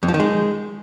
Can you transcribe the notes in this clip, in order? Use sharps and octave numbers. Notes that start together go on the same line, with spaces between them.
F2
F3
D#3
G#3